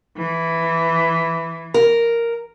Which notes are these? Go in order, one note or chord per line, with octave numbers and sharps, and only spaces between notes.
E3
A#4